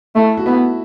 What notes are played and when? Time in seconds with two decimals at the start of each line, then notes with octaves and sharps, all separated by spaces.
0.15 A3 E4
0.37 F#4
0.46 B3 E4